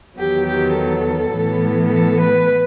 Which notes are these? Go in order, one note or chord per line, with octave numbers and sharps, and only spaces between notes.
E2 D#3 F#3 B3 G4
G4
A4
A2 E3 B3
A4
B4